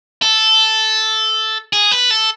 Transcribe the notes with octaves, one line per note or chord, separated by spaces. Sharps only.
A4
G#4
B4
A4